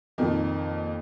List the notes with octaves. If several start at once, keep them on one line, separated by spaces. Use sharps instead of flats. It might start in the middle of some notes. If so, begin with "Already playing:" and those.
F2 A#2 D#3